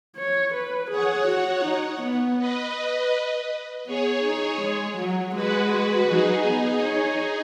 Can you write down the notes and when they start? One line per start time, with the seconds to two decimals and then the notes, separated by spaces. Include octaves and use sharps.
0.16 C#5
0.54 B4
0.90 G#4 C#5 F#5
1.27 F#4
1.64 D#4
2.02 B3
2.38 B4 D#5
3.86 B3 G#4 C#5
4.23 D#4
4.61 G#3
4.97 F#3
5.34 G#3 F#4 B4
6.08 F#3 D#4 G#4
6.46 B3
6.82 C#5